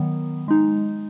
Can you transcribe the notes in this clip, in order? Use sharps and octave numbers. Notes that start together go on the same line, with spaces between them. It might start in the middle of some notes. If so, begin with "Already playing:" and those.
Already playing: D#3 F#3 B3
G#3 D#4